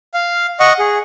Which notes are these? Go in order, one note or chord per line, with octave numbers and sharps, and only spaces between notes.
F5
D#5 F#5 C#6
G#4